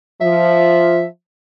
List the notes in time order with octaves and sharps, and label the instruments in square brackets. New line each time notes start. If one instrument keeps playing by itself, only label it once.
[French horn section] F3 [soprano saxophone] E5